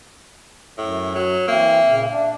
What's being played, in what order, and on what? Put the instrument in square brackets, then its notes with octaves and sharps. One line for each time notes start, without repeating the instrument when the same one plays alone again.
[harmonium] F#2 [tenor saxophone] A2
[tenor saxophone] F#3
[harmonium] E3 C4 [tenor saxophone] A#3 [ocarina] E5
[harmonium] A#2 C#3
[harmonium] D4 [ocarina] E5